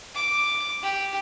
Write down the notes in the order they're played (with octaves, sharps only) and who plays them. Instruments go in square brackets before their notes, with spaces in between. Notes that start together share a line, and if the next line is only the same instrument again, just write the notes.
[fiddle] D6
G4